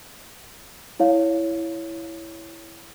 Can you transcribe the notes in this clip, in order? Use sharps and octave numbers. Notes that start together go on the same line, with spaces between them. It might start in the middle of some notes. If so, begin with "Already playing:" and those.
E4 C#5 F5